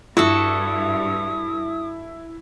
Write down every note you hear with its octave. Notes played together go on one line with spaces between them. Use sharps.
G2 E4 F#4 A4 D#6